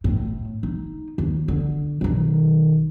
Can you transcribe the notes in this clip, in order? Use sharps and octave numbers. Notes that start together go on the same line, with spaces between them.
A2
D#4
D#2
D3
B1 D#3